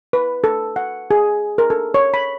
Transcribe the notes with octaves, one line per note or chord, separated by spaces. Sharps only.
B4
A4
F#5
G#4
A#4
A4
C#5
B5